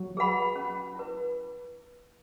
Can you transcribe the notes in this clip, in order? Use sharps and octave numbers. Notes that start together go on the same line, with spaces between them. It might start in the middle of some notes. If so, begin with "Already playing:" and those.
Already playing: F#3
G#4 B4 F#5 B5
C#4
E4 B4